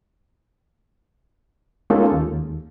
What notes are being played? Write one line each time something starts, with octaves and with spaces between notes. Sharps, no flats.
G#3 A#3 C#4 D#4 F4 A4
D#2